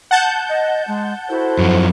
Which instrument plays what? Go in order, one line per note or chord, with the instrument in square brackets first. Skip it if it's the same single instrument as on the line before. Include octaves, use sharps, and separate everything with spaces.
[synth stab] F#5 A5 G6
[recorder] D#5
G#3
[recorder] E4 [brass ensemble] F#4 A4 C5
[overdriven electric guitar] F#2 F3